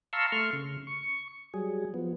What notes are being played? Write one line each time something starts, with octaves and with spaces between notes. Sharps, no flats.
F5 A5 A#5 C6 C#6 E6
A3 C6 C#6 F6
C#3
C#6
F#3 G3 G#4
F3 B3